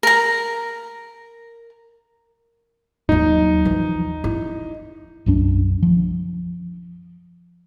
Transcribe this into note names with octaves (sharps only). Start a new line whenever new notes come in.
A#4 A#5
D#2 F#3 D#4
E3 F3
E4
B1 F#2 C#4 D4
F3